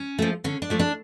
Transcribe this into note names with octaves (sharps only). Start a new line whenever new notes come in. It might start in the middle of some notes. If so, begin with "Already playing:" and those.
Already playing: C#4
F3 A3
D3 C#4
D4
F3 A3
D4